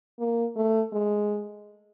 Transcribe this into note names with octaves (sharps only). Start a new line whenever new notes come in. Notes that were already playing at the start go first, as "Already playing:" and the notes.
A#3
A3
G#3